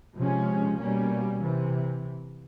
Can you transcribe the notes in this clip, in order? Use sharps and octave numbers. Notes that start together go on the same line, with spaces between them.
C3 F3 G#3 C#4
B2 G3 A#3 C#4
C3 E3